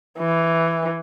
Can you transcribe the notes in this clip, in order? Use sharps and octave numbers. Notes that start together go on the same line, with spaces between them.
E3